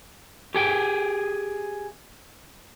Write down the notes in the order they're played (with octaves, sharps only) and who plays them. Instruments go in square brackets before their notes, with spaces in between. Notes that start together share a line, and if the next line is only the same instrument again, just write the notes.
[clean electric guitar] G4 G#4 G5